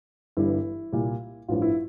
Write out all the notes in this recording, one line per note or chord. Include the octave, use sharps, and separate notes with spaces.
G1 G2 E3 G3 E4
C2 A#2 G3
A1 G2 F3 F4
E4